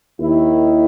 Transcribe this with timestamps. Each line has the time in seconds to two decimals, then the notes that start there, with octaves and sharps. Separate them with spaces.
0.19 D#2 D#3 E4